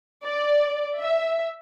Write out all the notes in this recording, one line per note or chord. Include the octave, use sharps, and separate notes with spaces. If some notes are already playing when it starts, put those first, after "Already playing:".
D5
E5